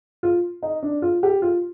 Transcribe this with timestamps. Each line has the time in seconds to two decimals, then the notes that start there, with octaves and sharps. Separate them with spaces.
0.23 F4
0.63 D#4
0.83 D4
1.02 F4
1.23 G4
1.42 F4